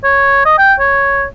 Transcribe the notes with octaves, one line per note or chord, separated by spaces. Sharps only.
C#5
D#5
G5
C#5